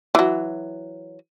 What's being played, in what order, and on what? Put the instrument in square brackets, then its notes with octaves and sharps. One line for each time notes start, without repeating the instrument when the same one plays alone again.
[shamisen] E3 F#3